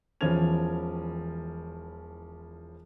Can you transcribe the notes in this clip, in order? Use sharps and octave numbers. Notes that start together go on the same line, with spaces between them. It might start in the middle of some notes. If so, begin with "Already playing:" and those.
E1 E3 F3 C#4 G#6 F7